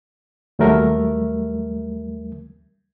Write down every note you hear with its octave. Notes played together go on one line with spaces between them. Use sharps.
D#2 F#3 G3 A3 A#4 E5